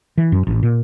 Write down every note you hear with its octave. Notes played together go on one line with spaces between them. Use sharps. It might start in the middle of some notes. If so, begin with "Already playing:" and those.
E3
F#2
A1
A#2